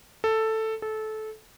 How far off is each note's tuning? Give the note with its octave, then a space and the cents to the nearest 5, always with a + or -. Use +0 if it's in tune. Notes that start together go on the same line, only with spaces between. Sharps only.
A4 +5
A4 -20